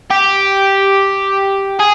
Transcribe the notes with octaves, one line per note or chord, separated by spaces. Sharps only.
G4
G#4